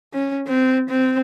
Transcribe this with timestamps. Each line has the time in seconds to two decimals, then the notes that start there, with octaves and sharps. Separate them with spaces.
0.14 C#4
0.47 C4
0.89 C4